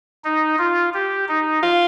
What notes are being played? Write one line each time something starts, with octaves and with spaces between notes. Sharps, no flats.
D#4
F4
G4
D#4
F4